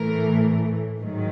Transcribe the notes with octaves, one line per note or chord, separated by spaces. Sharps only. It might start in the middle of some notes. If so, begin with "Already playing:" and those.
Already playing: A2 E3 A3 A#4
G#2 D#3 F#3